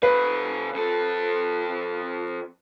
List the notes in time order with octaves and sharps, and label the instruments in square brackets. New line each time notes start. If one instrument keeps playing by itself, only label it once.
[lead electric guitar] C3 F5 [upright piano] B4
[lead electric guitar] F2 A4